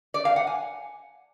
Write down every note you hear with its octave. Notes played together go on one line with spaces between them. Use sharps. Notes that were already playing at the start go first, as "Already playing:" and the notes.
D5
F5
F#5
G#5